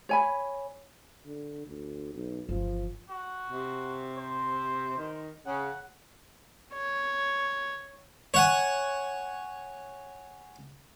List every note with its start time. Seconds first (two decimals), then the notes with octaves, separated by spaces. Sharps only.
0.09 C#5 G#5 B5
1.27 D3
1.66 D2
2.14 B1
2.49 G1 E3 F3
3.10 F#4
3.50 C3
4.17 C5
4.97 D#3
5.46 C#3 F#5
6.74 C#5
8.34 C#5 F#5 G#5